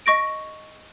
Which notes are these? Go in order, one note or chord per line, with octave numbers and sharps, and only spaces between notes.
D#5 C#6 A#6 D7